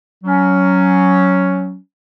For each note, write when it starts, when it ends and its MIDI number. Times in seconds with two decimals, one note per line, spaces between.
0.24 1.77 54
0.24 1.77 61